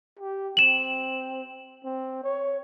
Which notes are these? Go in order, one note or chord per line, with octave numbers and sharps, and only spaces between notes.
G4
C4 E7 F#7
C4
C#5